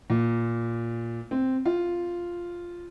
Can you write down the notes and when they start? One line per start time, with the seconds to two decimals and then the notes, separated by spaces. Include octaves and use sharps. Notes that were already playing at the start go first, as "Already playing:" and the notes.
0.10 A#2
1.31 C4
1.65 F4